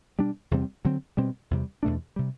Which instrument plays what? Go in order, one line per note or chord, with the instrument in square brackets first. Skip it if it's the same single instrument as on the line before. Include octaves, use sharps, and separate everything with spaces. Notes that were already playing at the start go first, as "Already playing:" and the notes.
[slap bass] B2 G3 D4
E2 C3 G3 C4
D3 F#3 C4
B2 G3 C4
E2 C3 G3
E2 B2 A3 D4
C3 G3